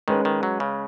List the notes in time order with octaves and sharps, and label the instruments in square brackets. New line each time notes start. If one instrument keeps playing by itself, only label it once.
[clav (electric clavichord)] D#3 [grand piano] G#3 C#4 B4
[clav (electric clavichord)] D#3
F#3
C#3